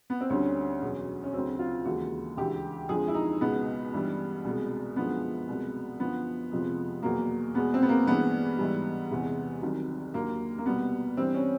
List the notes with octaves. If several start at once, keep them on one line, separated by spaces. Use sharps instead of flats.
B3
C4
D2 D3 G3 C#4
E2 B2 F#3
C#4
D2 C#3 F#3 C4
F4
D#2 C#3 E3 G#3 F#4
D2 C#3 E3 G#3 G4
F2 D3 F3 G#3 G#4
E4
D#4
C#2 B2 G#3 B3
G2 E3 G3
C2 B2 G#3
F#2 D3 F3 G#3 B3
C2 B2 G#3
F#2 D3 F3 B3
F2 C3 F3 G#3
E2 B2 F#3 A#3
E2 B2 G#3 B3
C4
B3
A#3
G2 E3 G#3 B3
G#2 E3 G3
E2 C3 E3 G#3
C2 C3 D#3 F#3
D#2 D3 F#3 A#3
A#3
C2 B2 G3 B3
G2 E3 G3 C4
C#4